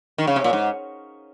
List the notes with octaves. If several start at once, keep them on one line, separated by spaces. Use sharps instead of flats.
D#3
C#3
C3
A#2
G#2